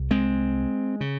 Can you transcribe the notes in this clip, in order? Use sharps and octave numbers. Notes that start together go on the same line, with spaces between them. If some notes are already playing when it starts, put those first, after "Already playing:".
Already playing: C2
G#3 C4
C#3